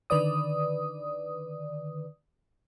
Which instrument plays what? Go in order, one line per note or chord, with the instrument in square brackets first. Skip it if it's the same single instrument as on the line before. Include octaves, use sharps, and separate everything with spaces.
[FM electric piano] D3 D#3 B4 D5 D#6